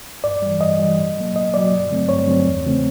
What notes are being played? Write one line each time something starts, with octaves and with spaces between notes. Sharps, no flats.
G2 D5
G3
E3
G2 D#5
E3 G3
B2
F#3 A#3
B2 D#5
F#3 A#3 D5
G2
D3 F#3 A3 C4
G2 C#5
D3 F#3 A3 C4
E2
C#3 F3 A3 C4